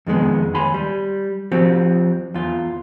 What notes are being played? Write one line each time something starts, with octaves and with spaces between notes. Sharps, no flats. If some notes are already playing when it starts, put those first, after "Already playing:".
F2 D#3 G#3 B3
D#2 G#5 B5 C6
G3
F3 C4 F#4 G4
E2 F4